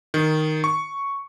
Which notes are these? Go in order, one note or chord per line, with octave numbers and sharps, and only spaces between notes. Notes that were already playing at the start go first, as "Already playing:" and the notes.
D#3
C#6